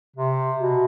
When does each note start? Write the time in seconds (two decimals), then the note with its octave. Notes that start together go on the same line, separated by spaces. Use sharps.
0.16 C3
0.59 B2